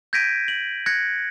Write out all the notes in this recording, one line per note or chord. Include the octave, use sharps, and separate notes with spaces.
G6 G#6 A#6 B6 D7 D#7
F#7
F#6 G#6 A#6 C#7